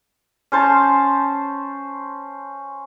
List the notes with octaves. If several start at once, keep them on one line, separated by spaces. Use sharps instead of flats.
C#4 C5 A5